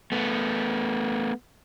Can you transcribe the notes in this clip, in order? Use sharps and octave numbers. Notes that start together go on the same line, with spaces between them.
A3 B3